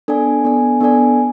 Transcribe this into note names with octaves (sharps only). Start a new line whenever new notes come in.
B3 D4 A4 D5 G#5
B3 D4 A4 D5 G#5
B3 D4 A4 D5 G#5